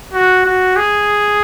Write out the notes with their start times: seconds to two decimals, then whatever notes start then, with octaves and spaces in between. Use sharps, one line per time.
0.13 F#4
0.45 F#4
0.76 G#4